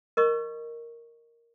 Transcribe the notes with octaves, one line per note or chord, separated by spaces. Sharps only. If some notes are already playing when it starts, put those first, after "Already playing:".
A#4 D#5 C#6